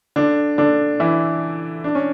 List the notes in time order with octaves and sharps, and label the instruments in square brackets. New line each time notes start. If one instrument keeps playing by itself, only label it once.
[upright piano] D3 D4
D3 D4
E3 E4
D4
C#4